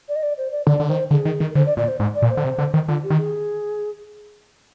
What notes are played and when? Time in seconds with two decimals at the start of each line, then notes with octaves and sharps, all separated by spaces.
0.08 D5
0.15 D#5
0.23 D5
0.37 C5
0.52 D5
0.67 D3 D5
0.80 D3
0.88 D#3 C5
1.11 D3 G#4
1.25 D#3
1.40 D#3
1.51 A#4
1.55 D3 C5
1.66 D5
1.77 A#2 D5
1.88 C5
2.00 G#2
2.15 D5
2.22 A#2
2.29 C5
2.37 D3
2.44 C3
2.58 D3
2.74 D#3
2.88 D3 F4
3.03 G4
3.10 D#3
3.18 G#4